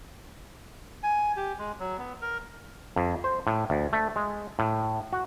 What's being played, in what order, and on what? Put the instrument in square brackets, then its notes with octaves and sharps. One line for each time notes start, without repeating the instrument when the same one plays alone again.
[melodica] G#5
G4
G#3
F#3
B3
A#4
[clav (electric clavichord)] F2
C5
A2
D2
A3
G#3
A2
F#4